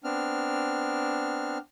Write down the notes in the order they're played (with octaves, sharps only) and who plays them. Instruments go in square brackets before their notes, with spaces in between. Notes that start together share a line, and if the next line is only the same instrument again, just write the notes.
[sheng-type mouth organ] B3 C4 D4 F6